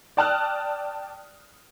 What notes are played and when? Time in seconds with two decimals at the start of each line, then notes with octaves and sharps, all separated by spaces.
0.17 D5 G5 A5 D#6 F6 F#6